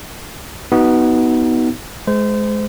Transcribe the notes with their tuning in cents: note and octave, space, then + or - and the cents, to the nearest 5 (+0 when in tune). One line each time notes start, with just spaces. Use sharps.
B3 +0 D#4 +25 F#4 +35
G#3 +20 C5 -30